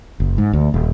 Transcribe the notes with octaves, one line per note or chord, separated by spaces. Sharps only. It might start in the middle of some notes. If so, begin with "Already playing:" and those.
F#1
G#2
D2
D#1